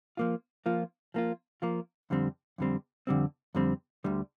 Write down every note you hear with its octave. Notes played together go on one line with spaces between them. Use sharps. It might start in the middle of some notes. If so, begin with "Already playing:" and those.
F3 A#3 F4
F3 A#3 F4
F3 A#3 F4
F3 A#3 F4
F2 D3 G3 C4
F2 D3 G3 C4
F2 D3 G3 C4
F2 D3 G3 C4
D2 D3 G3